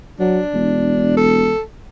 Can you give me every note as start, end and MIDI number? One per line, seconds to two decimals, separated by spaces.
0.20 0.40 54
0.20 1.15 62
0.54 1.56 28
1.17 1.61 69